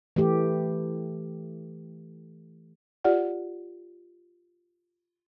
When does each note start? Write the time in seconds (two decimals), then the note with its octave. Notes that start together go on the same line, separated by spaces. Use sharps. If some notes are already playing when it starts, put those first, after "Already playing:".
0.16 E3 A3 G4
3.04 F4 G4 D5 F#5